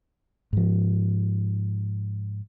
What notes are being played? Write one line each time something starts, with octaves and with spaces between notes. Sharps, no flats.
G#2 F3